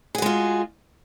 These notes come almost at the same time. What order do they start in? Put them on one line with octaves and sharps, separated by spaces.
G#4 F#4 G#3 F4